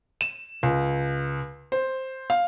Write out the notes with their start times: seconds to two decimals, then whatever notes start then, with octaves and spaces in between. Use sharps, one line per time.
0.21 E7
0.63 C#2
1.72 C5
2.30 F5